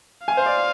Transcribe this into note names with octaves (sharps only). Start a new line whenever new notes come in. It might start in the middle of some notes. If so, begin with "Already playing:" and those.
F5 G#5
C5
D5